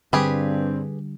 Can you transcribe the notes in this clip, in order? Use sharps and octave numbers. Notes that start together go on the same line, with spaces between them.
G2 D3 G3 C4 G4 G#4 B4